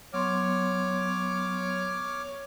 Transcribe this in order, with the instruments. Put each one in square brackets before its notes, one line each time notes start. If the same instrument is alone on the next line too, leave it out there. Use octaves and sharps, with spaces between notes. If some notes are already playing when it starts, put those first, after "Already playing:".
[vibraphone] F#3 B3 C6 [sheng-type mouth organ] C#5 D6 F6